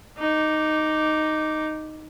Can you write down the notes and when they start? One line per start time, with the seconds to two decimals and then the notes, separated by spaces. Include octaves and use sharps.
0.18 D#4 D6